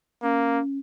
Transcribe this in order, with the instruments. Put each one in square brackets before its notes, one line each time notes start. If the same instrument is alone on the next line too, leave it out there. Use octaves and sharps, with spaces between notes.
[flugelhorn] A#3 [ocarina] C#4